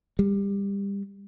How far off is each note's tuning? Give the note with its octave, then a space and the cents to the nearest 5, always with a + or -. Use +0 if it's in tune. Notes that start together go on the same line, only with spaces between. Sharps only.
G3 +25